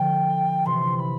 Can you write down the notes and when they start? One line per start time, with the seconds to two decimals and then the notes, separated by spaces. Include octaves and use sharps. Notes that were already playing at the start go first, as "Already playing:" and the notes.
Already playing: D3 F3 G5
0.66 C3 E3 C6
0.96 C6
1.00 B5